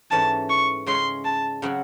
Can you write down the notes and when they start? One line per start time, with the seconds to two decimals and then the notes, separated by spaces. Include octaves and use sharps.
0.11 G#2 E3 A3 C#4 A5
0.50 C#6
0.86 C#3 G#3 C#4 C6
1.25 A5
1.62 C#3 F#3 C4 F#4